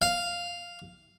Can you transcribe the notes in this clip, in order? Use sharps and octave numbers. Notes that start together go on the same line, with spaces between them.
F5